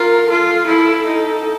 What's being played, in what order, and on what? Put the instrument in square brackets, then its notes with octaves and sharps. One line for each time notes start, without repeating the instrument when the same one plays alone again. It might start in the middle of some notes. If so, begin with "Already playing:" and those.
Already playing: [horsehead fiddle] F4 [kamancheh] A#4
[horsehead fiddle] F4 [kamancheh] A4
[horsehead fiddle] E4 [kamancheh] A4
[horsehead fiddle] D#4